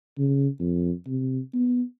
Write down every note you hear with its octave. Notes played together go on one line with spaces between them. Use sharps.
C#3
F2
C3
B3